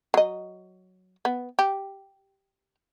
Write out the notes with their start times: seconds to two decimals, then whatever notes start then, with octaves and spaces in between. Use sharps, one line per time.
0.14 F#3 D#5
1.25 B3
1.59 G4